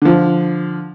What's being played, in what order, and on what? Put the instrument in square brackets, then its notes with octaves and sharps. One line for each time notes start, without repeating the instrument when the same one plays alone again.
[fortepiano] D3 F3